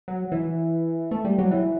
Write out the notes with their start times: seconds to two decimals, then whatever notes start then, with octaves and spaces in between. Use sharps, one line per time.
0.08 F#3
0.32 E3
1.11 A3
1.25 G3
1.39 F#3
1.51 E3